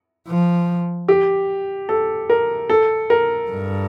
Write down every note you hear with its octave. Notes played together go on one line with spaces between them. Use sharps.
F3
G4
A4
A#4
A4
A#4
G2